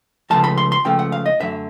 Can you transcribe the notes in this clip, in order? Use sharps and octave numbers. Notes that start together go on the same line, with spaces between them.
C#2 C#3 F3 A3 A5
B5
C6
C6
C#2 C#3 F3 A3 G5
F#5
F5
D#5
F#2 D3 F#3 A3 E5